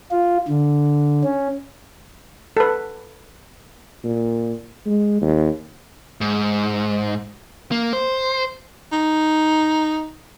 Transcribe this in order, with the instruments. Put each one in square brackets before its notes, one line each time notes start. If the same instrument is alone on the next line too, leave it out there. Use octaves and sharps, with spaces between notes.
[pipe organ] F4
D3
C#4
[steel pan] A4 B4
[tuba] A#2
G#3
D#2
[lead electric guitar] G#2
A#3
C5
[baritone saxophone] D#4